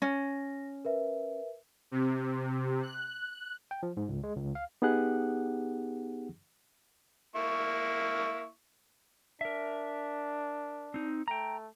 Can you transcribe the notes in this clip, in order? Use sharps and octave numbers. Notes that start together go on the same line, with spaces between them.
C#4 A#6
A#4 B4 E5
C3
F#6
G5
F3
G#2
C#2
G#3
C#2
F5
B3 D#4 G4 G#4 F#5 F#6
A#3 E4 C#6
D4 A#4 E5
C4 D#4
A3 G5 A#5